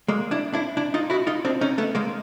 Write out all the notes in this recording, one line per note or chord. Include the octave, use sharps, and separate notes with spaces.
G#3 A#3
D4 E4
D4 E4
D4 E4
D#4 F4
E4 F#4
D#4 F4
C4 D4
C#4 D#4
A3 B3
G#3 A#3